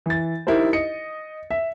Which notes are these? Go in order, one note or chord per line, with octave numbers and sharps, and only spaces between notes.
E3 A6
D#4 E4 G4 A#4 C5
D#5 C#7
E5